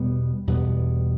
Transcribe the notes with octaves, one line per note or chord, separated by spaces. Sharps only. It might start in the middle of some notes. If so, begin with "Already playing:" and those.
Already playing: E2 B2 G3 B3
E2 B2 G3 B3